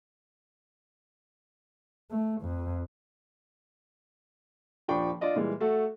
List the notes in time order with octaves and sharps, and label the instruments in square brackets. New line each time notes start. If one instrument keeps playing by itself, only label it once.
[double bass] A3
F2
[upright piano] D#1 F3 D4 G5 B5 C#6
D4 F4 D5 D#5
A#2 E3 G3 G#3
A3 F#4 A4